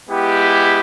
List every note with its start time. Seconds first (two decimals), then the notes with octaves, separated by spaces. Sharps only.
0.09 G#3 B3 E4 G4